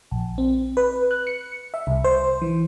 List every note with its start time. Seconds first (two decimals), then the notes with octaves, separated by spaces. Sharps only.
0.11 A#1
0.38 C4
0.77 B4
1.11 F#6
1.27 C#7
1.74 E5
1.87 C2
2.04 C5
2.42 E3